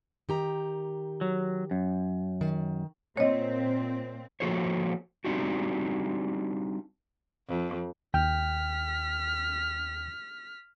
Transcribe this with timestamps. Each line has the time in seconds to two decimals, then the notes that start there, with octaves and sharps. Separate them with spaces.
0.29 D#3 G4 A#5
1.21 F#3
1.71 F#2
2.41 D#3
3.17 A#2 C4 C#5 D#5
4.40 F3 A#3 F#4 A4 C5 C#5
5.25 G3 C4 D4 D#4 F#4 G4
7.49 F2
8.14 D#2 G5 F6 B6